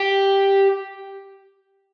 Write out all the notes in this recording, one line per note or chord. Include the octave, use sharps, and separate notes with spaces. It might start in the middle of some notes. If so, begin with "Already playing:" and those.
Already playing: G4